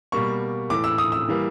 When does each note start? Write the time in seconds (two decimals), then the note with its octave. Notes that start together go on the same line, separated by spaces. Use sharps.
0.12 B2 G3 A#3 C#6
0.70 A2 E3 A3 D6
0.84 E6
0.98 D#6
1.12 E6
1.28 E3 G3 A#3